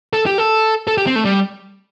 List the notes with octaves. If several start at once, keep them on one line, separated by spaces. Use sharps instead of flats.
A4
G4
A4
A4
G4
C4
A3
G3